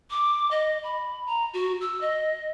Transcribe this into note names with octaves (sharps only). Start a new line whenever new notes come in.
D6
D#5
B5
A#5
F#4
E6
D#5